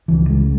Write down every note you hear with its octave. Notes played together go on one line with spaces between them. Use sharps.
C#2 C#3 E3
G#3